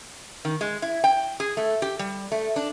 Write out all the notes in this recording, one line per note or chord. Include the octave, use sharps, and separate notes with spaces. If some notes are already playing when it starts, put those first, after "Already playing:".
D#3
G#3
E4
G5
G#4
A3
G4
G3
A3
D4